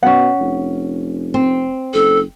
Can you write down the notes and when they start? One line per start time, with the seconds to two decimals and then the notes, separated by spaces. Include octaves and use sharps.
0.03 B2 C#4 F#5
0.40 F1
1.34 C4
1.94 F#1 A4